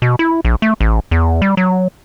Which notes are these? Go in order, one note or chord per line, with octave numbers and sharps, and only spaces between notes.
B2
E4
A#1
A3
A1
E2
G3
F#3